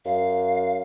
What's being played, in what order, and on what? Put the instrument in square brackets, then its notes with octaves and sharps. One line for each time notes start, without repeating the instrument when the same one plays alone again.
[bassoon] F#2 [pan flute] F5